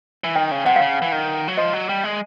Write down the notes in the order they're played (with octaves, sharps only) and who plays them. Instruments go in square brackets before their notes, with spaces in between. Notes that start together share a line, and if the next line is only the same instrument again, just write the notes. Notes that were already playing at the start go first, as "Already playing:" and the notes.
[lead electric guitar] E3
[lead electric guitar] D#3 [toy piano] G5
[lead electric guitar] C#3
[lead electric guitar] C3 [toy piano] F#5
[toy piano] F5
[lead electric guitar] C#3
E3
D#3
F#3
[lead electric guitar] F3 [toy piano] D#5
[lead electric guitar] F#3
G3
G#3